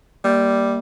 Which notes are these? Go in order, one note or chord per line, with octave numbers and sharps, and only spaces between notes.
G3 A#3